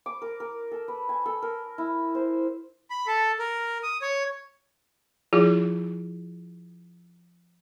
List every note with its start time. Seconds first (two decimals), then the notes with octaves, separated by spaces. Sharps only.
0.06 D6
0.22 A#4
0.40 A#4
0.71 A4
0.88 B4
1.09 G#5
1.26 A4
1.42 A#4
1.78 E4
2.15 C5
2.90 B5
3.07 A4
3.39 A#4
3.83 D#6
4.02 C#5
5.33 F3 E4 F4 G#4